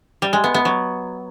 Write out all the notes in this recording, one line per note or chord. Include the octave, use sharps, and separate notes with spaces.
G3
G#3
B3
B3
F#3